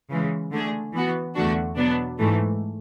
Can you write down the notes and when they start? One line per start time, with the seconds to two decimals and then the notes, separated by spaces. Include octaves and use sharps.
0.10 C#3 E3 G#3
0.51 D3 A3 D4 G#4
0.93 E3 B3 F#4
1.35 E2 D3 A3 D4 F#4
1.77 B2 F#3 B3 D4
2.18 G#2 E3 A3